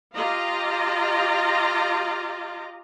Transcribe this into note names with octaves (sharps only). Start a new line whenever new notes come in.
F4 G4 D#5 F5 A#5